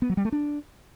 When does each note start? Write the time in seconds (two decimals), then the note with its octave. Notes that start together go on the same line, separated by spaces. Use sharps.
0.02 B3
0.10 F#3
0.17 G3
0.25 A3
0.32 D4